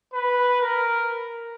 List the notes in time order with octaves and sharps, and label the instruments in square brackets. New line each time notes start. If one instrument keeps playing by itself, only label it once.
[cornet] B4
A#4